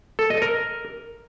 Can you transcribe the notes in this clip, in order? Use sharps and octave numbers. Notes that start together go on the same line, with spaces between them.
A4
D#5
A#4